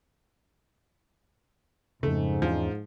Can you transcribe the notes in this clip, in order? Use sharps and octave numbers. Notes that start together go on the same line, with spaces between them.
F2 G#2 C#3 A3
E2 F3 C#4 D4